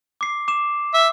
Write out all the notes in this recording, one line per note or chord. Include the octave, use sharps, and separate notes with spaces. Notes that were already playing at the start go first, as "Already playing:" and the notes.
D6 C7
D6 E7
E5